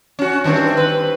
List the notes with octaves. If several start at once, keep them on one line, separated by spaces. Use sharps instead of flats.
C#4 F#4
G2 D#3 C4
B4